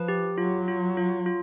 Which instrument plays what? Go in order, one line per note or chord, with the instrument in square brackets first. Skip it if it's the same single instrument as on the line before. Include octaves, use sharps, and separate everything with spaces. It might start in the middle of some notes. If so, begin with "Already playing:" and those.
Already playing: [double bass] F3 [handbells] B4
[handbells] G4
[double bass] F#3 [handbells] F4
[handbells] F4
F4
F4